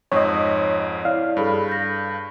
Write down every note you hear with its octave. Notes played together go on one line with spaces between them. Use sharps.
F2 G#2 C#5 D#5
E4 C#5 D5 F5
G2 G#4 A4 B5
G6 A#6